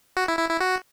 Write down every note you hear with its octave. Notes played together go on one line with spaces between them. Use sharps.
F#4
E4
E4
E4
F#4